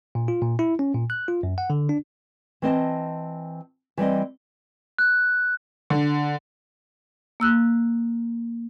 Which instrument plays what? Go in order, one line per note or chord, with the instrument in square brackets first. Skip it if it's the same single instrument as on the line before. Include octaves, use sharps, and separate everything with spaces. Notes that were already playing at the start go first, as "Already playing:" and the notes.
[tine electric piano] A#2
F4
A#2
E4
C#4
A#2
F#6
F4
F#2
F#5
D3
D4
[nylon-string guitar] E3 C4 D#5 A5
E3 G3 C4 D#5
[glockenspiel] F#6
[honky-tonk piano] D3
[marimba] A#3 E6 F#6